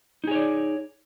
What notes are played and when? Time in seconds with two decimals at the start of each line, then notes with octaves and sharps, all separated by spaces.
0.24 D#4
0.27 G#4
0.31 C#5
0.35 D5